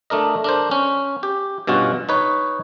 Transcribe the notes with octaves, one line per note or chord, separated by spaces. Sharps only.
A3 D4 A#4 D#5
D4 A#4 C5
C#4
G4
G2 B2 C#4 F4 F#4
D#4 B4 C#5